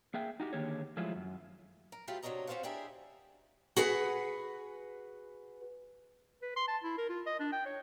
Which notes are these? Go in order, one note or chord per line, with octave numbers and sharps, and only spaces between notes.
A#3 G#4 E5 G5
D#4 F#4 G4
D3 D#3 A#3 G4 G#4 C#5
F3 F#3 G#3 A3 E4 F4
F#2
A#4
F#3 A3 B3 F4 G4 B4
C3 F#3 D4 C#5 D#5 A#5
C4 C#4 F4 C5 F5 F#5
D4 E4 G4 G#4 A#4 E5
F#4 G#4 B4 F#5
B4
C6
A5
E4
A#4
F4
D#5
D4
G5
C#5